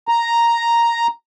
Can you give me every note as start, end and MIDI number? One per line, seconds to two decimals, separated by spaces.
0.08 1.07 82